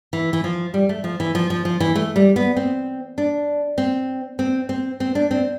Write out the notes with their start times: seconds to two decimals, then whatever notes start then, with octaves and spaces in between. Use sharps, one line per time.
0.13 E3
0.33 E3
0.44 F3
0.74 G3
0.89 A3
1.04 F3
1.20 E3
1.35 F3
1.50 F3
1.65 F3
1.80 E3
1.95 A3
2.16 G3
2.36 B3
2.57 C4
3.18 D4
3.78 C4
4.39 C4
4.69 C4
5.00 C4
5.15 D4
5.31 C4